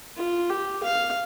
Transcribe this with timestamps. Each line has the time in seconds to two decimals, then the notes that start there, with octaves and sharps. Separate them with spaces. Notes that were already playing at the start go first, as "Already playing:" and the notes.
0.17 F4
0.50 G4
0.83 F5